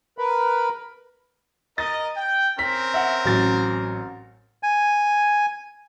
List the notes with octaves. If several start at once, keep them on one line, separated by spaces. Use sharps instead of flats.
A#4 B4 B5
A#4 D#5 A6
G5
C4 C#4 A#4 B6
E5 F#5
A1 F#3 A6
G#5